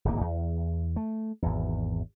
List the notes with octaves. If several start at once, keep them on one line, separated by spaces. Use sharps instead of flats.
D1 G#1 A#3
E2
A3
G#1 E2